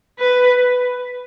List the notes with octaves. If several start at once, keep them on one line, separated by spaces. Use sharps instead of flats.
B4